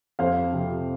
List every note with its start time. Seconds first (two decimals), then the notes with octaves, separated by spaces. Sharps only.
0.19 F2 C5 F5
0.52 C3 F3 C4